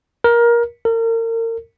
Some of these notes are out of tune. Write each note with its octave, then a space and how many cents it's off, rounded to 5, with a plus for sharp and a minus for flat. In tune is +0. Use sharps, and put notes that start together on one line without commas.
A#4 +20
A#4 -35